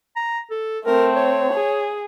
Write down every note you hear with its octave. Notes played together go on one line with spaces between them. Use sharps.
A#5
A4
A3 C4 A#4
C#5
G#4